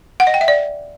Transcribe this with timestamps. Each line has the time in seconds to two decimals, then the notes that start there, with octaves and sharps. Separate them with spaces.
0.20 F#5
0.27 D#5
0.34 G5
0.41 E5
0.48 D5